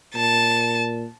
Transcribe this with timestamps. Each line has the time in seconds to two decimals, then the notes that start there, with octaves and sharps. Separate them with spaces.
0.15 A#2 A5